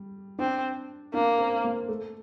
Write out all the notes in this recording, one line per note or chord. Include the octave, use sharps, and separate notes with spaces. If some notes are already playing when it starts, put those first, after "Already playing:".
Already playing: G3
C4 D4
A#3 D4
C4
A#3
A3